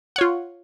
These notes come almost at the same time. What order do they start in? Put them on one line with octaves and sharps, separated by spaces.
F#5 C#5 F4